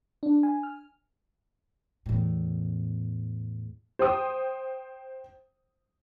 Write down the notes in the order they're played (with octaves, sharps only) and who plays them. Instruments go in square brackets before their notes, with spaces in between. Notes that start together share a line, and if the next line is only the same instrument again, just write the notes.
[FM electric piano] D4
G#5
F6
[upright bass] E2 A2
[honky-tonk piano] C5 G5 D#6